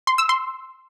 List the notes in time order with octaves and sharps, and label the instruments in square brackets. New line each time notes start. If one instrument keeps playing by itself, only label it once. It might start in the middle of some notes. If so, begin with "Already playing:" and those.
[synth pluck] C6
E6
C6